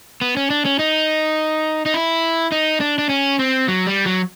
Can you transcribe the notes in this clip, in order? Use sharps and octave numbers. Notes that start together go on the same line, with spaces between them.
B3
C#4
D4
C#4
D#4
D#4
E4
D#4
D4
D4
C#4
C4
F#3
G3
F#3